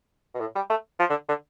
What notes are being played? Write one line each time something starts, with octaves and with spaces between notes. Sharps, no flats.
B2
A2
G3
A3
F3
D3
D3